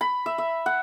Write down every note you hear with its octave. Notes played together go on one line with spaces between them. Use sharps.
B5
E5
E5
F#5